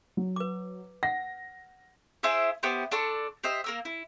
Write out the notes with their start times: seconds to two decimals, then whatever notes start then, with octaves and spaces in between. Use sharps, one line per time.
0.17 F#3
0.36 B4 D6
1.03 F#5 A#6
2.23 E4 G#4 C5 E5
2.63 B3 E4 G4 C5
2.91 D4 A4 C6 C#6
3.44 G4 C5 D#5 E5
3.64 A#3 A#4 E6
3.85 E4